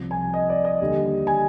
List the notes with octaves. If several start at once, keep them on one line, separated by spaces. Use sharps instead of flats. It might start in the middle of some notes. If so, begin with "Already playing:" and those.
Already playing: C2 C3 F3
G#5
D#5
D5
D#5
D#2 D3 G3
G#5